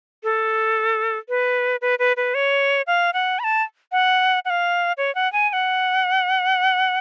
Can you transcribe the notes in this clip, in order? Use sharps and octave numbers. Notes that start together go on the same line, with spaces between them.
A4
B4
B4
B4
B4
C#5
F5
F#5
B5
A5
F#5
F#5
F5
C#5
F#5
G#5
G#5
F#5